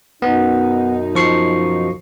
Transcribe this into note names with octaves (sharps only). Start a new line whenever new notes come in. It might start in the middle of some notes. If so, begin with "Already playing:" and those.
F#2 B2 B3 D#4
F3 C#6 C7